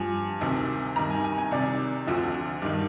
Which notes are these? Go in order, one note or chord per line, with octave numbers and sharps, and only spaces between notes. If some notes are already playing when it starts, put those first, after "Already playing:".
Already playing: G2 F3 G#5
D2 C3 D#3
G2 D#3 A#5
G#5
G#5
G#5
C2 C3 D#3 D5
D2 D3 F3
G2 D#3